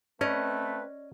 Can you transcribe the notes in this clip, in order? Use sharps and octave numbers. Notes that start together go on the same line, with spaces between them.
A3 C4 C#4 B4 D5 D#5 A#5